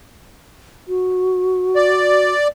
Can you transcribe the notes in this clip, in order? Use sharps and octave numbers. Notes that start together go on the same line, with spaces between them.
F#4
D5